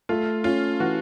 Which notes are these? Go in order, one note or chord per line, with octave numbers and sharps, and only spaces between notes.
A3 F4
C#4 F4
E3 F#4